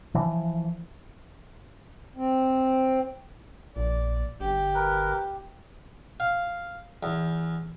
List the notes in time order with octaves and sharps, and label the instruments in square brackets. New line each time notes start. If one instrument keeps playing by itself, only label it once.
[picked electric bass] E3 F3
[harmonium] C4
[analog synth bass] A#1 [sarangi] D5
[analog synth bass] G1 [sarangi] G4
[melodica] A#4 B4
[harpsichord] F5
E2